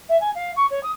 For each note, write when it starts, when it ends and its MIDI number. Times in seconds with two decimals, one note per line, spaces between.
0.09 0.19 76
0.21 0.30 80
0.35 0.51 77
0.56 0.66 85
0.70 0.82 73
0.83 0.90 87